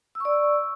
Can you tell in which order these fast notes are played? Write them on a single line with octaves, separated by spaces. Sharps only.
E6 C#6 D5